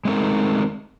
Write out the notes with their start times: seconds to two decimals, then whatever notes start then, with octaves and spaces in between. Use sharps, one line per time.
0.05 G#3 A3 C4 D#4 A#4